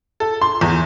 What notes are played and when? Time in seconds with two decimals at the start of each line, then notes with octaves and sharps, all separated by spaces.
0.20 A4
0.42 C6
0.61 E2